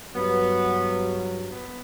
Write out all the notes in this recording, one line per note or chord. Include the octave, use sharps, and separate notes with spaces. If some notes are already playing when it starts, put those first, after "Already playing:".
G2 F#3 B3
B3